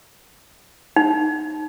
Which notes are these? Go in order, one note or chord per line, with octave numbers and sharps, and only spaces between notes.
D#4